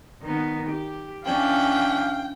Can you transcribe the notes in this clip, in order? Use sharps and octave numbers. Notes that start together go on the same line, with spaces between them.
D#3 B3
G4
E3 C#4 D4 F5 G5